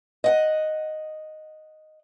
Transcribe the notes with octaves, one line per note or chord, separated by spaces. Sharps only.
D#5 F#5